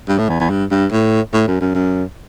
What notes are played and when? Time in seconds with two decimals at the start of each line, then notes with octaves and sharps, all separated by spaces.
0.08 G2
0.18 A2
0.29 E2
0.40 E2
0.50 G2
0.71 G2
0.91 A2
1.33 A2
1.47 F#2
1.61 F#2
1.75 F#2